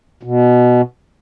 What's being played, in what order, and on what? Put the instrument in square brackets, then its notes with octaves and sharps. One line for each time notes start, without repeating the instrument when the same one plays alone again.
[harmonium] B2